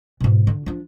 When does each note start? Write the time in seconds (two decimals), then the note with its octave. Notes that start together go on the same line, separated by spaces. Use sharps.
0.20 G#2 B2
0.47 D3
0.66 F3 D4